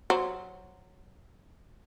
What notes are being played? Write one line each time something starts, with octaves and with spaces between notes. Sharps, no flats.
F#3 C5